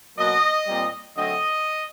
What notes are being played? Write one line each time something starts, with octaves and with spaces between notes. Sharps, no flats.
B2 F#3 A#3 D#5
A#2 G3 C4
D3 F#3 A3 C4 D#5